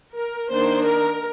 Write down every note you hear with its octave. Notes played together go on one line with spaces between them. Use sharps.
A#4
D#3 A#3 D4 C5
A#4